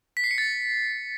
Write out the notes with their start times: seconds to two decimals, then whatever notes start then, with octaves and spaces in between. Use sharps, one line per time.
0.17 B6
0.24 C7
0.31 C#7
0.38 A6